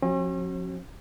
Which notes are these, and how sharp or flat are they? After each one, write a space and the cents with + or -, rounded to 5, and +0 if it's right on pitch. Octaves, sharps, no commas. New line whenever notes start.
F3 +35 C#4 -45 F#4 +25